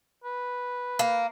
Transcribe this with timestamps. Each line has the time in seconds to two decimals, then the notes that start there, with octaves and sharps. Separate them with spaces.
0.24 B4
0.99 A#3